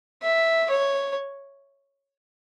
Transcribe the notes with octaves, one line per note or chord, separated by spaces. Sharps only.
E5
C#5